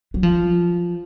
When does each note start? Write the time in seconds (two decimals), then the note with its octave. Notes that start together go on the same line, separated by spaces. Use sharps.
0.14 F#3
0.23 F3